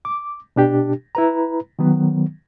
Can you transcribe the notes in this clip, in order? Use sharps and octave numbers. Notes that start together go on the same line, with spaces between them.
D6
B2 D4 G4
E4 B4 A#5
D#3 F#3 B3